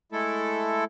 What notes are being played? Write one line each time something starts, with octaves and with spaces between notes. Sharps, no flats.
G#3 A3 E4 A4